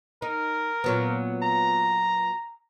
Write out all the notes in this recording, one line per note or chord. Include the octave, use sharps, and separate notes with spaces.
D#4 A#4
A#2 F#3 B3
A#5